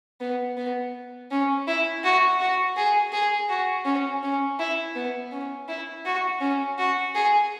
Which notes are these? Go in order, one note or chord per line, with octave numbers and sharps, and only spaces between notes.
B3
B3
C#4
E4
F#4
F#4
G#4
G#4
F#4
C#4
C#4
E4
B3
C#4
E4
F#4
C#4
F#4
G#4